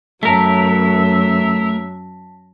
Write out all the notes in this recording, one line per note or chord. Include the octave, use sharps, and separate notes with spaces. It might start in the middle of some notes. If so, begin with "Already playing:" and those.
F#2 F#3 A3 A#4 E5 A5 A#6 B6